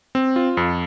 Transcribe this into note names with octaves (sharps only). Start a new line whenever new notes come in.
C4
F4
F2